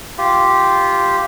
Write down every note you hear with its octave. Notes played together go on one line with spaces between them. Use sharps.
F4 G4